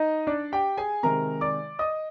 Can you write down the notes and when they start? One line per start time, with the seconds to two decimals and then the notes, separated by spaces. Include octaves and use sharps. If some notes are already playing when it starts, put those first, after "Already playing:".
Already playing: D#4 D#5
0.27 D4 D5
0.52 G4 G5
0.77 G#4 G#5
1.03 C3 D#3 G#3 A#4 A#5
1.41 D5 D6
1.79 D#5 D#6